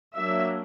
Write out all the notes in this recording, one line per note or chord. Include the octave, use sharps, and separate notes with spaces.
F#3 A#3 D4 E5